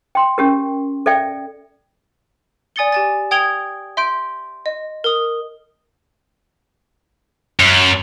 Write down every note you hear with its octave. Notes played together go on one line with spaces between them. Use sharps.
G5 C6
C#4 G4 A#4
A4 D5 E5 G5
D5 G#5 D#6 A6 C#7 G7
G4 G#5 A6
G5 D#6 G#6 D7 F7 G7
E5 C6 G6 D7
D#5
A#4 D#6
F#2